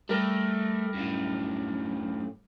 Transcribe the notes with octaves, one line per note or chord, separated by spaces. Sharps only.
G3 A3 A#4
F#2 A2